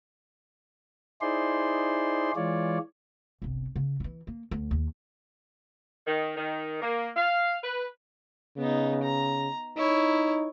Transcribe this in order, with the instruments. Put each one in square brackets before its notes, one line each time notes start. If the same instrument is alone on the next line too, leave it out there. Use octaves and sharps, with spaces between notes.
[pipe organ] D#4 E4 G#4 C5 D5 C6
E3 G#3 F4 C#5 D5
[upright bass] G1 C2
C#3
E3 E4
A#3
D2
D#2
[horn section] D#3
D#3
A#3
F5
B4
[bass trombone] C#3 [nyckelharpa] B3 D#4
[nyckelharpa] A#5
[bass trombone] D#4 [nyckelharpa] E4 C#5